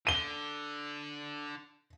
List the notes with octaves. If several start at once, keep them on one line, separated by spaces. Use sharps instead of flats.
D3 D#7 G7